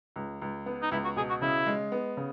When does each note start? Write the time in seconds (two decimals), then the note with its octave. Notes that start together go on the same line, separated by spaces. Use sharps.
0.16 C#2
0.42 C#2
0.66 B3
0.82 D#4
0.91 C#2 E4
1.04 F#4
1.16 B2 G#4
1.29 F#4
1.41 C#3 E4
1.66 G#3
1.92 B3
2.17 C#3